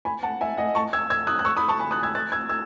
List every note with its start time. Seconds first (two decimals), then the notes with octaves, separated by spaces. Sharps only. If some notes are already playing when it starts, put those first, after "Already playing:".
0.05 G#5 B5
0.23 F#5 A5
0.41 E5 G#5
0.57 D#5 F#5
0.75 A5 C#6
0.93 E6 G#6
1.10 E6 G#6
1.27 D#6 F#6
1.39 F#6
1.45 C#6 E6
1.57 B5 D#6
1.68 A5 C#6
1.80 G#5 B5
1.91 D#6 F#6
2.03 E6 G#6
2.15 F#6 A6
2.32 E6 G#6
2.49 E6 G#6